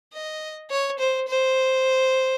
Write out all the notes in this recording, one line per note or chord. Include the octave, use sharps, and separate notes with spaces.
D#5
C#5
C5
C5